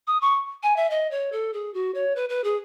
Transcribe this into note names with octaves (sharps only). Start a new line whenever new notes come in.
D#6
C#6
G#5
E5
D#5
C#5
A4
G#4
F#4
C#5
B4
B4
G#4